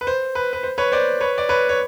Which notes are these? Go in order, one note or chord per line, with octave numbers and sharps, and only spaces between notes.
B4
C5
B4
B4
C5
B4 C#5
C5 D5
B4 C#5
D5
B4 C#5
C#5